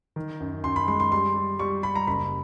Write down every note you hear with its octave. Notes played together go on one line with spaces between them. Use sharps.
D#3
F#2
F#2 C6
B5
G#3 C6
C6
G3 C6
G3
G3 C#6
G3 B5
A#5
F#1 B5